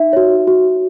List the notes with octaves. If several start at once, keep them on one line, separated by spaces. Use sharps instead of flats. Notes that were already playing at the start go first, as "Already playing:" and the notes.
Already playing: D#4 E5
F#4 C#5
F#4